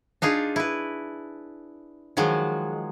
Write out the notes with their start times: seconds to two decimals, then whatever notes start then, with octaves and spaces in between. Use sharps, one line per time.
0.22 D4 D#4 F4 G#4
0.56 E4 B4
2.17 D#3 F3 F#3 G#3